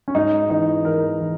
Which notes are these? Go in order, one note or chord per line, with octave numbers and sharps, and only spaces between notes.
C#4
G#2 D#4
E3 D#4
E3 A#4
E3